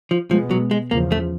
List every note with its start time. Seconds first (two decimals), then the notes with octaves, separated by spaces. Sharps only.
0.11 F3
0.31 B2 F3 G#3 B3
0.51 F#3
0.71 G#3
0.91 E2 C#3 F3 A#3
1.12 A3